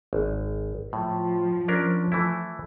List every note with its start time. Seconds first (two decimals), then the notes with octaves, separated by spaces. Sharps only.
0.13 G#1
0.93 A2 F3
1.68 C#4 D4 A#4
2.12 E3 A3 E4